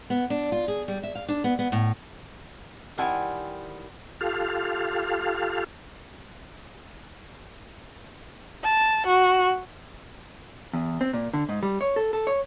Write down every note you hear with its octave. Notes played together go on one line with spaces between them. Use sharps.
B3
D4
F4
G#4
G3
E5
F5
D4
B3
B3
A2
D#3 G3 C4 E4 F#5 G#5
F4 G4 A4 F5
A5
F#4
E2
C4
A#2
D3
G#2
G3
C#5
A4
A4
C#5